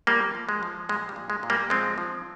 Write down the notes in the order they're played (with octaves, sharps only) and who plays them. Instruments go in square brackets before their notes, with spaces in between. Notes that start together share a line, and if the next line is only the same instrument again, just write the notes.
[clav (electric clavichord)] F3 G3 A#3
F3
G#3
F3
A#2 G#3
G3
A#2
G#3
A#2
G3 A#3
F3 G#3 C4
F3